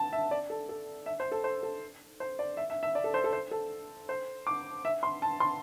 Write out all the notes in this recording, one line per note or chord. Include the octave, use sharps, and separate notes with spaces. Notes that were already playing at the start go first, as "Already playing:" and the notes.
Already playing: A5
E5
D5
A4
A4
E5
C5
A4
C5
A4
C5
D5
E5
E5
E5
D5
A4
C5
A4
C5
A4
C5
D6
E5
C6
A5
C6